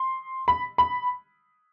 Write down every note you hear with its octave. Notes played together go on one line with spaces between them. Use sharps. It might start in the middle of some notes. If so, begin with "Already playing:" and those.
Already playing: C6
B5
B5